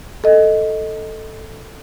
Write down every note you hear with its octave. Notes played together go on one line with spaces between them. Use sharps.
A4 D#5